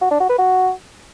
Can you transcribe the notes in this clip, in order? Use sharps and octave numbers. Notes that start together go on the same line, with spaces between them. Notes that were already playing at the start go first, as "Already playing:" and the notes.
F#4
D4
F#4
B4
F#4